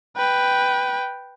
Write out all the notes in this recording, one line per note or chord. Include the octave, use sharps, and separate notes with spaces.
B4 G5